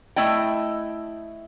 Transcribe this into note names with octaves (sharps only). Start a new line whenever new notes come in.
A3 E4 D#5 G5